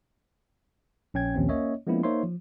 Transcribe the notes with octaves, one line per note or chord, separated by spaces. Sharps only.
A#1 C#4 G5 G#6
A#1 D#2 C4 C#4
A#3 C#4 C#5 D#5 E5
F3 G#3 A#3 B3 C#4 E4
A#3 D#4 C5 C#5 E5 C6
F3